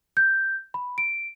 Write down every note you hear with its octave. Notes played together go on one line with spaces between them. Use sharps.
G6
B5
D7